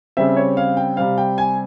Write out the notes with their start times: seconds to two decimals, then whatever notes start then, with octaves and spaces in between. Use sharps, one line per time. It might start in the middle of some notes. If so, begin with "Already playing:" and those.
0.17 C#3 G3 C4 E5
0.37 C#5
0.57 F5
0.77 G5
0.97 C3 G3 C4 F5
1.18 G5
1.38 G#5